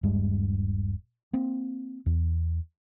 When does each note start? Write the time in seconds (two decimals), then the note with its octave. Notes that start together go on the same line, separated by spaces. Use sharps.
0.03 D#1 G2 G3 G#3
1.33 A#3 C4
2.06 E2